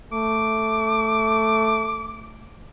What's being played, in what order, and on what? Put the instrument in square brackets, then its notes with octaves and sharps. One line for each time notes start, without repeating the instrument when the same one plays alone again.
[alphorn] A3 [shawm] D6